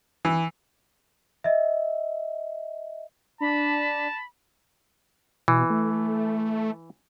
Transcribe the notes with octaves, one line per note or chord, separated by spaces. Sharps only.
E3
D#5 E5
D4 A5 B5
B2 E3
A3